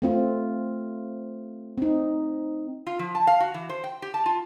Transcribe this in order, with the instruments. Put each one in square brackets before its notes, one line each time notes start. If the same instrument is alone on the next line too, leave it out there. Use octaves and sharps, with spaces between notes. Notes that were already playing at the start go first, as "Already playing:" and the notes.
[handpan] A3 C4 F4
C4 D#4
[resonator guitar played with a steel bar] F4
F3
A5
F5
F#4
E3
C5
G5
G4
A5
F4